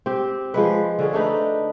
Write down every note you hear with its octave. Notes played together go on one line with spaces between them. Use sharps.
C4 G4
F3 G#3 B4
D3 C#4 G#4
A3 D4 D#4 B4